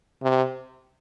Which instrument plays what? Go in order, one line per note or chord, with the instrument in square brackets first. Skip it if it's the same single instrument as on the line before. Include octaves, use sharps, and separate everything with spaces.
[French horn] C3